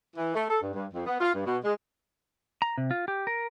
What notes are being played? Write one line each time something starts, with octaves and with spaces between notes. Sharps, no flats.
E3
A3
A4
G2
G2
F2
B3
F4
G2
B2
G#3
A#5
C3
F4
G4
A#4